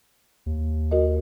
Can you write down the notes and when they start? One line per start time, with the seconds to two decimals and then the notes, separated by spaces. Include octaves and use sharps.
0.46 D#2
0.91 F#4 A#4 D#5